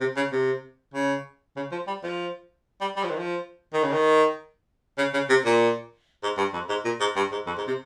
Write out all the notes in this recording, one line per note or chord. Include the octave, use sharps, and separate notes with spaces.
C3
C#3
C3
C#3
C#3
F3
G3
F3
G3
G3
F3
D#3
F3
D#3
C#3
D#3
C#3
C#3
C3
A#2
G#2
G2
F2
G#2
A#2
G#2
G2
G#2
F2
G#2
C3